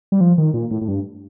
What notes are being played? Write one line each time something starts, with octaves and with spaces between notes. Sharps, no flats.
G3
F3
D#3
A#2
A2
A2
G2